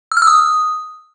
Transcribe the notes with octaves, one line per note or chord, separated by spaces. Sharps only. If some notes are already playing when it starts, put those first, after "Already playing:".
E6
F6
E6
D#6